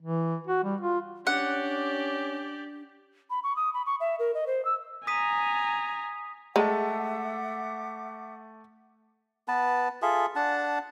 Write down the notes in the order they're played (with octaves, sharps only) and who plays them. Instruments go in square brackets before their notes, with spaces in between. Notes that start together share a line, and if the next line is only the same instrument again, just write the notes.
[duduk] E3
F#4
G3
F4
[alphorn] C#4 [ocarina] D4 [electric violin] G4 D5 [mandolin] F#5
[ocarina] B5
C#6
D#6
B5
C#6
E5
A#4
D#5
C5
E6
[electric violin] G#5 A#5 [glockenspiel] D#6 B6 D#7
[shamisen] G#3 [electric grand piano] A3 A5 [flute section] E5 F#5 D6
[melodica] B3 B4 A5
F4 G#4 A4 E5
D4 F#5 A5